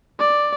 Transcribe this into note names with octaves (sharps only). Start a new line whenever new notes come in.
D5